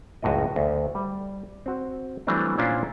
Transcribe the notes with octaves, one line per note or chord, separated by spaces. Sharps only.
C#2 F#2 A2 F#4 D#5
D2
G3
C4 F#4
E3 F#3 G3 A3 C4 D4
A#2 C#4 D4 E4 F4 C5